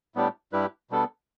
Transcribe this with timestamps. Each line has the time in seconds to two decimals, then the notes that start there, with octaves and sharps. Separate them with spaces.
0.15 A2 G3 B3 D4 G4
0.53 G2 G3 E4 G4 B4
0.90 B2 G3 B3 D4 A4